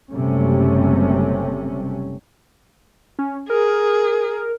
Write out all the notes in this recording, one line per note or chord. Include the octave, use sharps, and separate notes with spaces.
F#1 C3 G3 A3 C#4
C#4
G#4 A#4